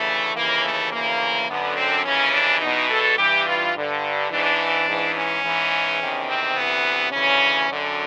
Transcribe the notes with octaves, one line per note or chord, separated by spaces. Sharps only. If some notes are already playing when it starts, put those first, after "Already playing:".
Already playing: D2 C#3 E3 A3
D#2 C#3 E3 A#3
A3
D2 C#3 E3 A#3
F#2 D3 B3
C4
D#2 C#3 E3 C#4
D4
E2 B2 D#4
A4
G2 E3 G4
F4
G2 D3
G#2 E3 D4
G#2 E3
C#4
G#2 E3
E2 C3 D#3
C4
D2 C3 E3 B3
D2 C#3 E3 C#4
F#2 D3